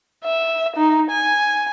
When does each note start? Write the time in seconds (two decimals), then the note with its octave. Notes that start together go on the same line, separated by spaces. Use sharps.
0.24 E5
0.76 D#4
1.11 G#5